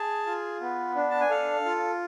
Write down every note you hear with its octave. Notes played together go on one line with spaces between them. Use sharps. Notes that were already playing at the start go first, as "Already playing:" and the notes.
Already playing: G#4 A5
F4
B3
D4
A5
G#5
A4 F5
F4